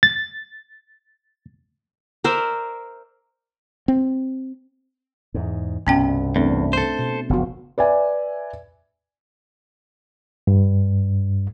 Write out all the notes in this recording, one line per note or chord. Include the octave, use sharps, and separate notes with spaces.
A6
A#4 C5 D5 E5
C4
E2 G#2
C2 G2 B2 B3 C#4 G5
E2 A3 C4 D4
A4 C5
B2
F#1 A2 F3 B3 F#4
B4 D5 E5 G#5
G2